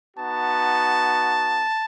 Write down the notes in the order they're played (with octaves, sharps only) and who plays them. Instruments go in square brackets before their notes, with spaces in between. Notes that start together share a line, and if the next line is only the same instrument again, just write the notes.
[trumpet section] B3 D#4 F#4 A5